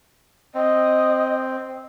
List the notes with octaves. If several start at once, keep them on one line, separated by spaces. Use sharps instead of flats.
C4 D#5